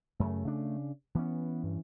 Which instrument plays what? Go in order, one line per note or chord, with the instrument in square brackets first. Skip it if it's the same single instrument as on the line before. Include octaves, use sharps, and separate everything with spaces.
[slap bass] F#2 C#3 [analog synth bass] A3
[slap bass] C#3 D4
[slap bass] E3 C#4 [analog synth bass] B3
[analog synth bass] G2